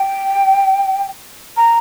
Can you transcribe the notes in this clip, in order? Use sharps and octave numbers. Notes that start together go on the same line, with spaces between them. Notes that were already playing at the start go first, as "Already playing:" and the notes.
Already playing: G5
A#5